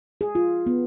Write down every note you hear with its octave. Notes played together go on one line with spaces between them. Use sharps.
G#4
F4
B3